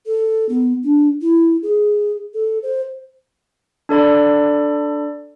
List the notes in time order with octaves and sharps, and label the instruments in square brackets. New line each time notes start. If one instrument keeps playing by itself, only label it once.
[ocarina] A4
B3
D4
E4
G#4
A4
C5
[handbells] D4 A4 D5 B5